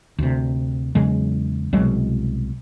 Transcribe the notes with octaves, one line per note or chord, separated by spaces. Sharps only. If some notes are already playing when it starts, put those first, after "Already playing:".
D2 C3
E2 C#3 F#3 G#3
C2 B2 F#3 G#3